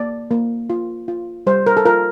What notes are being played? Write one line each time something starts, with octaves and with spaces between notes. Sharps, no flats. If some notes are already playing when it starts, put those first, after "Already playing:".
Already playing: A#3 D5
A#3
F4
F4
G3 C5
A#4
A4
F4 A#4